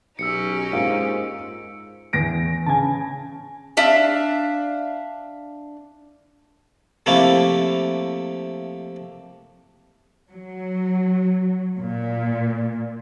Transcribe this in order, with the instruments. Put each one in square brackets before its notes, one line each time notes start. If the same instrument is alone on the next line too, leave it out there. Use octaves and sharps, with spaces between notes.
[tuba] B1 [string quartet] C#4 D#4 G4 [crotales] E6 C#7
[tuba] G#2 [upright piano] A#3 F4 [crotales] D7
[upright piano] E2 A#6 D7
[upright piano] C#3 [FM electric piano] G#5 A5
[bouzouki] D4 E5 F5
[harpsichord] C3 F3 A3 A#3 E4
[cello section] F#3
A#2